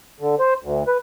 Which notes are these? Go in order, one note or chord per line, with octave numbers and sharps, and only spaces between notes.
D3
C5
D2
B4